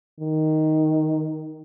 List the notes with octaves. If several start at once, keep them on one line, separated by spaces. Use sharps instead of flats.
D#3